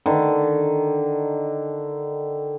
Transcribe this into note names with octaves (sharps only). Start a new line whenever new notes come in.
D3 D#3